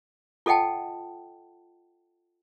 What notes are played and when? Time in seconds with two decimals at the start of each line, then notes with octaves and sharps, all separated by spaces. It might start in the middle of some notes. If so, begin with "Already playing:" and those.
0.46 F4 A4 D#5 F#5 G5 A5